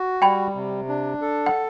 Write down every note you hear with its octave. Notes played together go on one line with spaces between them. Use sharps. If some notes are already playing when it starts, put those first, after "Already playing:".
Already playing: F#4
G3 G5 B5
C3
D4
A4
F#5